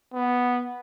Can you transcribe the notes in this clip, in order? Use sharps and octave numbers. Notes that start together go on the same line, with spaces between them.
B3